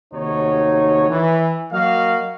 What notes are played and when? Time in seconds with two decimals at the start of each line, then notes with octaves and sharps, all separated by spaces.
0.13 D#2 C3 A3 D#4 F#4 C#5
1.09 E3
1.72 F#3 A#3 F#4 D#5 F5